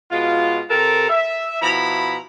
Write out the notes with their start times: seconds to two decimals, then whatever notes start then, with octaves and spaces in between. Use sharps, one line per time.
0.11 B2 G#3 F4
0.70 C3 G4 A4 A#4
1.09 E5
1.62 B2 F3 E4 A#5 B5